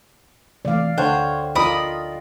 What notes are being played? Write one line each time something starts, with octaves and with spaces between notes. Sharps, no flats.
C3 E3 A3 D5 F5
D2 D3 C5 C#5 G5 F#6
F4 A#4 D5 D#5 B5 D#6